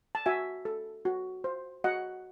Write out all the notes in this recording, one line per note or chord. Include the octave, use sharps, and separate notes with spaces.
A5
F#4 E5 G#5
A4
F#4
C5
F#4 D#5 F#5